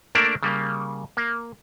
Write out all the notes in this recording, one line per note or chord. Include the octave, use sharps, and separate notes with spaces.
A3 A#3 D4 A#4 D5 E5
C#3 G3 A#3
A#3